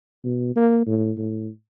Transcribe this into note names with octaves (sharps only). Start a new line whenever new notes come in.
B2
A#3
A2
A2